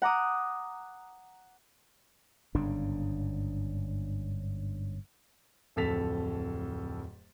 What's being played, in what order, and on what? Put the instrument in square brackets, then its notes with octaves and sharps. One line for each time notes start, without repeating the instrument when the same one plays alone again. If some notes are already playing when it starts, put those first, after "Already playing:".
[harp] F#5 A#5 D6 D#6
[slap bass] G1 G#2 C#3 D4
[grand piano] D1 F2 A4 A6 B6 F7